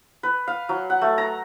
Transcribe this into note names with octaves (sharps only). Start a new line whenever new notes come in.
B4
F5
F#3
F#5
A3
A#5